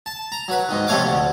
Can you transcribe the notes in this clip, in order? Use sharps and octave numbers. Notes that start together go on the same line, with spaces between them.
A5
A#5
F#3 B4
G#2 D#3
F2 C3 A3 C#5 F5 D6
D2